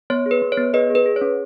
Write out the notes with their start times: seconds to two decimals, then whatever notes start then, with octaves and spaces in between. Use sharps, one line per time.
0.10 B3 C#5
0.26 G#4
0.31 B4
0.42 B3
0.52 C#5
0.57 B3
0.74 G#4 B4 D#5
0.90 G#4
0.95 B4
1.06 G#4
1.16 C#5
1.21 C#4